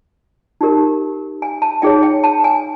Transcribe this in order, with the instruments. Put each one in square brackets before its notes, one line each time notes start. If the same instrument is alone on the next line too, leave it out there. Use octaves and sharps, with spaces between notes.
[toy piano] D#4 G4 A#4
G#5
A5
D#4 G#4 C#5 G5
G5
A5
G#5